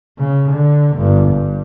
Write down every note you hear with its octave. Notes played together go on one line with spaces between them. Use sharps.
C#3
D3
G1 G2
G2